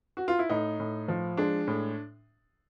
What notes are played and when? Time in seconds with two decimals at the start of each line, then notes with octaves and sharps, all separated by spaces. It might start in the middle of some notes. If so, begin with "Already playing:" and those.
0.17 F#4
0.28 F4
0.39 E4
0.49 A2 D#4
0.80 A2
1.08 F3
1.37 G#3 D4
1.68 A2